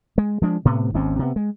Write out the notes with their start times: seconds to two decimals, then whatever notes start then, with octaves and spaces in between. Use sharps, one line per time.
0.18 G#3
0.42 F3 G#3 D4
0.65 A2 C3 B3
0.94 G#1 D#2 C4 C#4
1.19 C3 B3
1.36 G#3